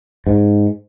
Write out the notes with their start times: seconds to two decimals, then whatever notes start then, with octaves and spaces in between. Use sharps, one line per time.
0.27 G#2